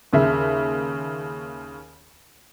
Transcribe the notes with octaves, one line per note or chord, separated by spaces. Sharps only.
D#2 C#3 E5